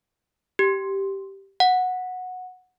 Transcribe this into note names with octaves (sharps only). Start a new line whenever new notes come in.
G4
F#5